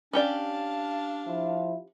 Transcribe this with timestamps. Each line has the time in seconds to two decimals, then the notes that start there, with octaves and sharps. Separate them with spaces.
0.13 C#4 D4 G4 D5 F5 A5
1.27 F3 E4 F4